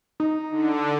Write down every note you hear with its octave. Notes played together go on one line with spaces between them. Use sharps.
D#4
D3